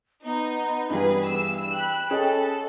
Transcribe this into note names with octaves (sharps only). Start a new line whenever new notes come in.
B3 D#4
G2 E3 G3 G#4 B4
E6
G5 B5 F#6
C#4 G#4 A4 D#5